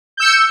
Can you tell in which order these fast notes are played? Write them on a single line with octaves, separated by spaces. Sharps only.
G6 E6 C#7